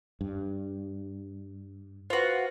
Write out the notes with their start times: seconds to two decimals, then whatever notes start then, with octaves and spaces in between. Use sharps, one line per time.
0.21 G2
2.10 F4 F#4 B4 C5